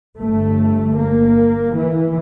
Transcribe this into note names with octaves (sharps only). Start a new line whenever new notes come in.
G1 G2 A3
A#3
E3